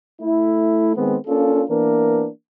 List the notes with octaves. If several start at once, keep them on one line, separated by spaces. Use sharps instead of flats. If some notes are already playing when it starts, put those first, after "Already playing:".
A3 E4
D#3 G#3 B3 C4
A#3 C#4 D4 F4 A4
E3 A#3 B3 D4 A#4